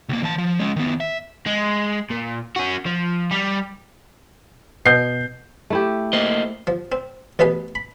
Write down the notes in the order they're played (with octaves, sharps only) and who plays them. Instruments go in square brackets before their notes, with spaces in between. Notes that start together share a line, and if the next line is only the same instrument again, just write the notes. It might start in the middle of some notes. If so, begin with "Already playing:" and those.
[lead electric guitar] C#2 A#3
E3 A5
F3
G#3 C#4
D#3 B3
E5
[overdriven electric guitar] G#3
A#2
C#4 F#4
F3
G3
[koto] B2 [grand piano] G6 C7
[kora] A3 E4 G4
[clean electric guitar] A#3 C5 D#5
[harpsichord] F3
C4
A1 B2 B3 G#4 B4
B5